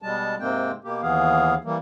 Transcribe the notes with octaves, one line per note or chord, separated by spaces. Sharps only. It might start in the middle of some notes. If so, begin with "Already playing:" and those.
B2 G3 G#3 A5
G#2 C3 G#3 A#3 C4 G5
B2 A#3 G4
D#2 E3 B3 G#4 F5
E3 G3 A#3